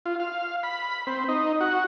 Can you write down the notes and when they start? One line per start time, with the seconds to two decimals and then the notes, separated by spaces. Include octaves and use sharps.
0.06 F4
0.20 F5
0.63 B5
1.07 C4
1.29 D#4
1.61 F#4